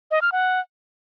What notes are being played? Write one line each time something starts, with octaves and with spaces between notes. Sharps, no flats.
D#5
F6
F#5